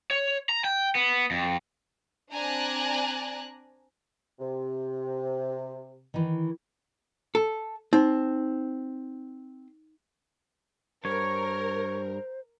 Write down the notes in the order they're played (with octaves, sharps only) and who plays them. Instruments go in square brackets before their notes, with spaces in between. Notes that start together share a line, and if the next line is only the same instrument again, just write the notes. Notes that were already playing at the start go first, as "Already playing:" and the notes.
[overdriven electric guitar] C#5
A#5
G5
B3
F2
[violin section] C4 D4 D5 G#5 A#5 F#6
[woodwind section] C3
[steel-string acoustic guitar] D#3 E3
[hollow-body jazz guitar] A4
[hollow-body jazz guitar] C4 [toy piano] D#4
[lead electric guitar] G2 [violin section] A#4 [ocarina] C5 [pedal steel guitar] C#5